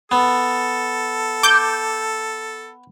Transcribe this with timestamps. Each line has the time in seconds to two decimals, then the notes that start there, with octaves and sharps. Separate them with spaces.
0.11 B3 A4
1.43 D6 G6